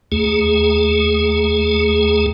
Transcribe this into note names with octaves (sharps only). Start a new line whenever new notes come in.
D#2 A3 G#4